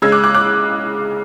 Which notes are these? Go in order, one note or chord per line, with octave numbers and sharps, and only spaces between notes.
C#3 G#3 E6 G#6
D6 F#6
D6 F#6
D6 F#6